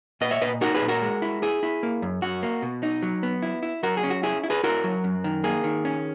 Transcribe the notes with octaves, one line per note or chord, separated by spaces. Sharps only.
A#2 B4 D#5
C#5 E5
A#2 B4 D#5
D#4 F#4 A#4
G#4 B4
A#2
F#4 A#4
G#3
E4
E4 G#4
E4
A#3
F#2
F#2 F#4
A#3
B2
D#4
F#3
B3
E4
E4
F#3 F#4 A#4
G#4
C#4
F#4
E4 G#4
E4
G#4 B4
E4 F#4 A#4
F#3
F#2
D#3
A#3 G#4
D#3
C#4